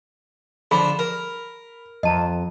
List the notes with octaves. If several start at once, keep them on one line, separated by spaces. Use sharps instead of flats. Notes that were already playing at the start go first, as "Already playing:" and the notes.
D3 F3 G#4 B5
A#4
F2 D#5 A5 A#5